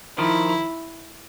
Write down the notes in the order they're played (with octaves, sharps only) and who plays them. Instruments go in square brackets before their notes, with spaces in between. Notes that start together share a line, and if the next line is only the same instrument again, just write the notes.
[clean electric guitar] D#3 F3 [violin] E4